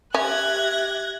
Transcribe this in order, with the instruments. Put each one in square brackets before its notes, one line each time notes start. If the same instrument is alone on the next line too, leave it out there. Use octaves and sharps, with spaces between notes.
[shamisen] C#4 [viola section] G4 [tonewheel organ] E5 [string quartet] F#6 G#6 A#6